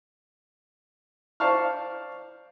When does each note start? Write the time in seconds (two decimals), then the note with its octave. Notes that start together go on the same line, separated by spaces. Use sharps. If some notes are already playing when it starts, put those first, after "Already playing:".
1.40 C5 D5 F5 A5 C#6 F6